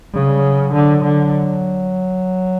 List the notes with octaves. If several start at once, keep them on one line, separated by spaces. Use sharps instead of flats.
C#3 F#3
G3
F#3
D3 F#3
D3